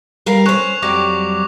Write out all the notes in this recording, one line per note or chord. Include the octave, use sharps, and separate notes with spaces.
G3 A#4 F5
C#4 C5 C#6 F#6 F7
F2 F#3 G3 D6 A#6